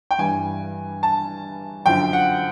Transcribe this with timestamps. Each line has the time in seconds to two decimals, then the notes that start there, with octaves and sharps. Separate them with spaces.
0.11 G5
0.19 G2 E3 G3 G#5
1.03 A5
1.86 F#2 D3 F3 G5
2.13 F#5